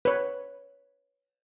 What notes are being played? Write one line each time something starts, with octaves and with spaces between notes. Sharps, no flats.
B4 C#5